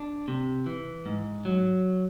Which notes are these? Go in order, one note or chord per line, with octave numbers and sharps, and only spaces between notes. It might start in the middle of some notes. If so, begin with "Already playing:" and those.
Already playing: D4
C3
E3
G#2
F#3